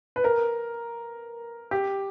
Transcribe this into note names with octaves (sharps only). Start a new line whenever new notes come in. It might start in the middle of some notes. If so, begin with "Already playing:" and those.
B4
A#4
G4